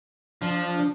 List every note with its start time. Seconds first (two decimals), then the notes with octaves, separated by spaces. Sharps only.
0.42 F3 D4